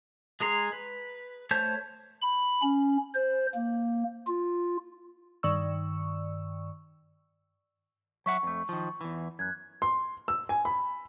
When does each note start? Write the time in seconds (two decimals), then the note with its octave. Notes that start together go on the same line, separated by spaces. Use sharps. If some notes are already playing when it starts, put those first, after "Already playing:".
0.40 G#3 G#4 A#5 C6
0.72 B4
1.51 A3 C5 C#5 A5 G6
2.22 B5
2.62 C#4
3.15 C5
3.55 A#3
4.28 F4
5.43 G2 D#3 D5 C#6 E6
8.26 F#3 E5 F#5 C#6
8.43 F2 A3
8.69 D#3 F3
9.01 E2 E3
9.39 F#2 F#6 G#6
9.82 C6
10.28 E6
10.49 G#5
10.65 B5